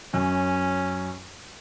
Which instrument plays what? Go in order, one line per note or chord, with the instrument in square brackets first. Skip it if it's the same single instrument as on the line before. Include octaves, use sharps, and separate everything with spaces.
[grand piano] F#2 [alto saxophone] C#4